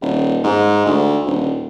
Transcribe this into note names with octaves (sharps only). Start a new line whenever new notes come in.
D#1
G#2
D2
D#1